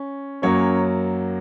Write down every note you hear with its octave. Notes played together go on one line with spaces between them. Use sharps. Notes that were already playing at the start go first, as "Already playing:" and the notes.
Already playing: C#4
F#2 F#3 A#3 C#4 C#5